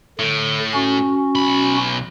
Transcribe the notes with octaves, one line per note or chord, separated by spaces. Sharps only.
A2 D3
C#4 F#4
B1 B5